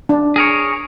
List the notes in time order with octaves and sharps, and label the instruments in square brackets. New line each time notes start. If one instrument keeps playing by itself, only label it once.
[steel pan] D4
[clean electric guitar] G#4 A#4 C#5